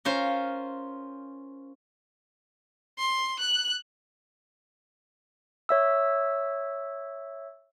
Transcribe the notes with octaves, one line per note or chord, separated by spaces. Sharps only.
C#4 F4 A#4 C5
C6
F#6
C#5 E5 E6